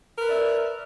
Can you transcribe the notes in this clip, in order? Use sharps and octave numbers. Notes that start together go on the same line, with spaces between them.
A#4 B4 D5 E5